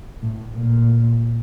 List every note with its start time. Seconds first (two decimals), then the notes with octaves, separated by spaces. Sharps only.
0.22 A2
0.55 A#2